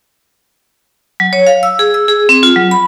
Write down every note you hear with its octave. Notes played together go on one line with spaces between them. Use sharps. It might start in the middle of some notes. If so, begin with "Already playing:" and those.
F#3
C#5
F5
E6
G#4
E6
G#4
C4
F4
F#3
B5